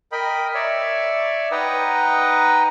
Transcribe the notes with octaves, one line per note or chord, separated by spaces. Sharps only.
A#4 D#5 G5 B5
C#5 D5 E5
D#4 B4 D#5 F#5 G5 A#5